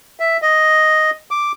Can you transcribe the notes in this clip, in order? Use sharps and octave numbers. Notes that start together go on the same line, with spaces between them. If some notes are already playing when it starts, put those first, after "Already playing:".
E5
D#5
D6